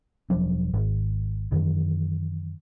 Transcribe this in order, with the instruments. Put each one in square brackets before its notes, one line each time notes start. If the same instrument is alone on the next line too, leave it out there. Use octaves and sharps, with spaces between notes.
[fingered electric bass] E1 F3 F#3 D4
G#1
F#2 D#3 E3